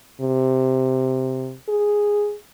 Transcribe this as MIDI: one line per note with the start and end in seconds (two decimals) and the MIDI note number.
0.21 1.56 48
1.69 2.35 68